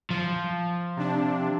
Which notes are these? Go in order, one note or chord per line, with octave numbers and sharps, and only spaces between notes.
F3
C3 D4